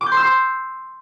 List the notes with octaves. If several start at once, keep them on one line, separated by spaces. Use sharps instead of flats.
D6
G6
C6
E6
C6